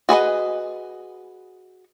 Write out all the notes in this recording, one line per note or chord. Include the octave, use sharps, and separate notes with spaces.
F#4 G#4 B4 D#5